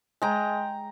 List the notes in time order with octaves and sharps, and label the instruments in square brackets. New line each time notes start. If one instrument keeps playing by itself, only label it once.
[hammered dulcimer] G#3 G5 A#5